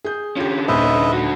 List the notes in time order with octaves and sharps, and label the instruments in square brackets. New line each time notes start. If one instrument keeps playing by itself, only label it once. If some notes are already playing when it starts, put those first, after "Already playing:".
[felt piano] G#4 G6
[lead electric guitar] D3 C#4 [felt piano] F4 G4
[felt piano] D#1 D#2 C5 [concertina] B4 D#5 E5
[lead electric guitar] D3 F#4